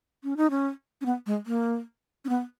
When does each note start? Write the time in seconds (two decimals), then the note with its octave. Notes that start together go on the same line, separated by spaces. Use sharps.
0.24 C#4
0.37 D#4
0.50 C#4
1.01 C#4
1.06 B3
1.26 G#3
1.46 A#3
2.25 C#4
2.29 B3